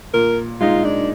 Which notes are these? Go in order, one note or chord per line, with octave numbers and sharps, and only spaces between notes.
A#2 A#4
G#3 D#4 F4
D4